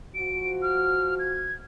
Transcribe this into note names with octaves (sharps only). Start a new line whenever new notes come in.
F3 F#4 D7
F6
G#6